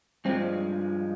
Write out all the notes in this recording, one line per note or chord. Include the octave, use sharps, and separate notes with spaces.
G2 F3 G#3 C4